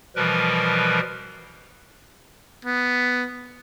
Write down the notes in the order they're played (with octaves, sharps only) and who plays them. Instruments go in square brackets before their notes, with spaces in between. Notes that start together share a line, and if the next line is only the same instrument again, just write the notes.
[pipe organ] B2 E3 F3 G3 A#4 B4
[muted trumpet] B3